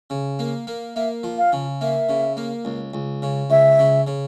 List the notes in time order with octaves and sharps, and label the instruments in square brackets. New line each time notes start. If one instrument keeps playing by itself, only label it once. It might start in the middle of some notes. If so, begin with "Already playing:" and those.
[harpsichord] C#3
A#3
A#3
[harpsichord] A#3 [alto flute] E5
[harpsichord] F3
[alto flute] F5
[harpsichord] C#3
[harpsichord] A#3 [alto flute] E5
[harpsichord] C#3
A#3
C#2
C#2
C#3
[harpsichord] C#2 [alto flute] E5
[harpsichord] C#3
C#3